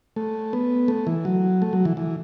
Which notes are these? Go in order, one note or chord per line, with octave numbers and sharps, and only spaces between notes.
A3
B3
A3
E3
F#3
A3
F#3
E3
E3